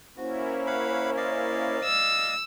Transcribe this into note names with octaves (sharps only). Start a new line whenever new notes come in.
A#3 C#4 E4 F#4 C5
F5 F#5 B5
D5 D#5 F5
E6